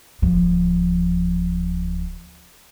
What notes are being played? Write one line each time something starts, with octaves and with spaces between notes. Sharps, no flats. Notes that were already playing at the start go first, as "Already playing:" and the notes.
D1 F3